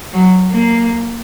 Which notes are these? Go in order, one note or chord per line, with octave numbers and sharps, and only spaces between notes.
F#3
A#3